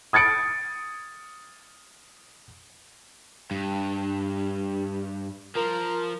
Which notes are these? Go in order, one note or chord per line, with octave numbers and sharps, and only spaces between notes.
D#6 G#6 A6 C#7 D7
G2
F3 A#4